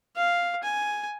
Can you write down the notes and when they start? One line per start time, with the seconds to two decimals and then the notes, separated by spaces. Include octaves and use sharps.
0.16 F5
0.63 G#5